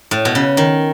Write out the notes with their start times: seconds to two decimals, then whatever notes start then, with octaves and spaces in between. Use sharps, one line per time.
0.11 A2
0.25 B2
0.35 C#3
0.57 D#3